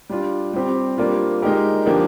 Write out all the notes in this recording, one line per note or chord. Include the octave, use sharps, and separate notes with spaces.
G3 D4 F4
G3 C4 G4
G3 A#3 D4 F4
G#3 D#4 G4 A#4
D3 F3 A#3 D4 G4